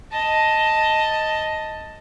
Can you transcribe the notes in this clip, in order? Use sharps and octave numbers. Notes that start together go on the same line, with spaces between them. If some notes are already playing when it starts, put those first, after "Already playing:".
D#5 A5